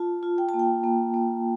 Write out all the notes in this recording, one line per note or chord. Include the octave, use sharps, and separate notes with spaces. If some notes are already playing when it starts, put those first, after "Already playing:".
Already playing: F4 A5
F4
G5
A5
A#3
G5
A#3
A#3